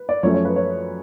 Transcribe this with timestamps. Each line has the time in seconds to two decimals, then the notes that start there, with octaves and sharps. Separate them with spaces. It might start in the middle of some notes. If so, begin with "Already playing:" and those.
Already playing: B4
0.09 D5
0.23 F#2 F3 A3 C#4 C#5
0.34 C#5
0.45 B4
0.56 C#5